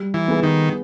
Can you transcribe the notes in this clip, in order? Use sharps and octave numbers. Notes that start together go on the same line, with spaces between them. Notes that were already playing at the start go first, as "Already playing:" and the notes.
Already playing: G3
E3
B3 D#4 G#4 B4
D#3